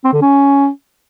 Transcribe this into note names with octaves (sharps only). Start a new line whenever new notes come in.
C4
D3
C#4